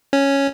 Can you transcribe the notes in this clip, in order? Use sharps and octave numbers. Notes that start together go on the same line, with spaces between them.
C#4